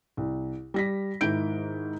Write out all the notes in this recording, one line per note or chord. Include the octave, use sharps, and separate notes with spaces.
C2
G3 A#6 B6
G#2 D#3 E4 G6 D7